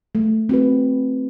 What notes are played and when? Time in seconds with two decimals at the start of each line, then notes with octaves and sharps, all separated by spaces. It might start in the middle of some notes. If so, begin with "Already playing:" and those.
0.15 A3
0.49 C4 F#4 B4